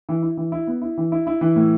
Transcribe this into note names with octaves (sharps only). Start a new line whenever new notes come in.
E3
E4
E3
E4
B3
E4
E3
E4
E4
E3
A2